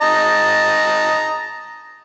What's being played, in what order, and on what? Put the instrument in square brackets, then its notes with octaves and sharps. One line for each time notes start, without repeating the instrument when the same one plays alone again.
[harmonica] D#5 A5 A#5